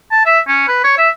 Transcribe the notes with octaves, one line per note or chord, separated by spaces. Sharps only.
A5
E5
C#4
B4
C#5
E5